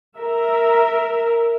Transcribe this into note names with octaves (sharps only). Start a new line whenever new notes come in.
A#4 E5